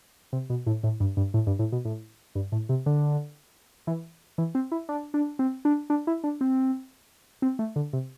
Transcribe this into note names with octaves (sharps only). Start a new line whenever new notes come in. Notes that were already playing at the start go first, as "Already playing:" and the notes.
C3
B2
A2
A2
G2
G2
A2
G2
A2
B2
A2
G2
A2
C3
D3
E3
E3
C4
E4
D4
D4
C4
D4
D4
E4
D4
C4
C4
A3
D3
C3